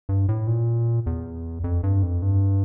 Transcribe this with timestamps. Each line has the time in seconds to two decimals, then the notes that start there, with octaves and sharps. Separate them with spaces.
0.09 G2
0.29 A2
0.47 A#2
1.06 E2
1.64 F2
1.83 G2
2.03 F2
2.22 G2